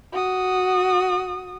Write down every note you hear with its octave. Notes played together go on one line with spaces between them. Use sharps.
F#4 D#6